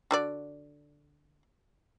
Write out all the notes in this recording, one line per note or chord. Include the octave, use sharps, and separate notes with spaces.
D3 F#4 D5